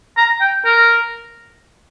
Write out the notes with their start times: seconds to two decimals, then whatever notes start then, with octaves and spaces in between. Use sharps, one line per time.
0.17 A#5
0.41 G5
0.65 A#4